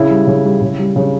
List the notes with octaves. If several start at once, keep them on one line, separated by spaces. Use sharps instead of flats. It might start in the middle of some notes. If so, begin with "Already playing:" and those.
Already playing: C#3 E4
G3
C#3
G3
C#3
G3
C#3